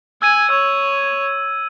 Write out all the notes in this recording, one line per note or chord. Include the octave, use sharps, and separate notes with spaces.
G#5 E6 G#6 D#7
C#5 E6